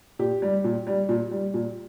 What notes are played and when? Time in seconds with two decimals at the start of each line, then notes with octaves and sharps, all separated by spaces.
0.19 A#2 G4
0.42 G3
0.64 A#2
0.87 G3
1.09 A#2
1.31 G3
1.54 A#2